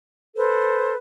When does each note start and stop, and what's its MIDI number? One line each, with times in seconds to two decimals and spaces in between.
0.35 0.95 69
0.35 0.95 71
0.35 0.95 72